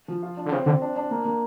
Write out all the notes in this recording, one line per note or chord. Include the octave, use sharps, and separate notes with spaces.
F3
F4
D4
D3
C#3 C4
D3 C4
D4
D4
A#3
A#3